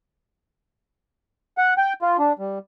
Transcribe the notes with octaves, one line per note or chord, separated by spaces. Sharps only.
F#5
G5
F4
D4
G3